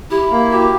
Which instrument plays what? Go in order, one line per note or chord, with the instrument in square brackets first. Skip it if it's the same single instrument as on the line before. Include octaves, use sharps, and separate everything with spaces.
[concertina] E4 [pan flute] G4
[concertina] A#3
[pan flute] F#4 [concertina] G4